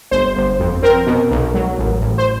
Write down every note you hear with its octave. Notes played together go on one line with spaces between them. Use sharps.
G1 C5
G1
F2
C4 A#4
B2
B1
F#3
A1
A1
C5